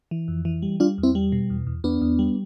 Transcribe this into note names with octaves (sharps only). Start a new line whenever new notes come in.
E3
F2
E3
G3
G3 D4 F4
E2
C4 E4
G3
B2
E2
E2
E2 B3 D4
E2
G3